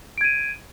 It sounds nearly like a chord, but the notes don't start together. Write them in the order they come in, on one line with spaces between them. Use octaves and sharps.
D7 G#6 D#7